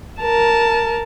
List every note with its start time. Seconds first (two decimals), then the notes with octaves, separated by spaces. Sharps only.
0.20 A#4 A5